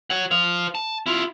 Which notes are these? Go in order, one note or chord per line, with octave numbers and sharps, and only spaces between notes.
C#5 F#5
C5 F5
A5
E4 F4